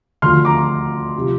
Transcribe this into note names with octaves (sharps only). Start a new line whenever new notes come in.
D2 D3 F3 C6 F6
A#5 D6
C3 F3